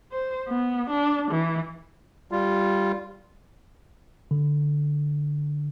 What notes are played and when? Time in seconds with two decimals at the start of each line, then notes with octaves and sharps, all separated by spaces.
0.12 C5
0.49 B3
0.90 D4
1.31 E3
2.31 G3 F4
4.31 D3